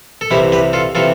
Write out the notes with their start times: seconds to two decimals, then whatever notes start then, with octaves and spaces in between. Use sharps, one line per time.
0.21 A4
0.31 C2 C3 E3 E4 G4
0.52 G4 B4
0.73 F4 A4
0.95 C3 E3 F4 A4